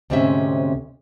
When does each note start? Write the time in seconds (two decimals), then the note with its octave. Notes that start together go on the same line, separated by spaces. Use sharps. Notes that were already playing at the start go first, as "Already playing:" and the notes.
0.10 D2 G#2 C3 C4 C#4 E5